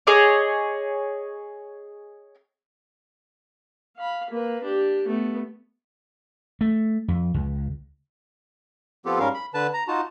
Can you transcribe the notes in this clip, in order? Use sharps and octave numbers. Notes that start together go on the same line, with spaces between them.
G#4 C#5 D#5 D6
F5 B5
A#3 B4
D4 G4
A3 B3
A3
F2
C#2
F3 B3 C4 F4 G4 A4
G#2 G3 C#4 A#4 F5
B5
D3 B4 A5
A#5
D#4 F4 F#4 A5